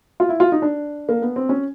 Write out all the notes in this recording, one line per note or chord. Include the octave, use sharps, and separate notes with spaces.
F4
E4
F4
D#4
D4
A#3
B3
C4
C#4